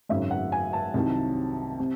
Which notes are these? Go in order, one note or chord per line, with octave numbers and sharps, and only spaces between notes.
G#1 F#2 C#3 F#3 E5
F#5
G#5
A5
C2 C3 D#3 F#3
C3